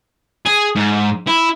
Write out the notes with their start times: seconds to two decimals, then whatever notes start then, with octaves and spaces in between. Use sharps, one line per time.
0.45 G#4
0.75 G#2
1.27 E4